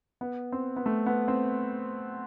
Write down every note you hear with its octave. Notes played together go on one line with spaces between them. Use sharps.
B3
C4
B3
A3
B3
C4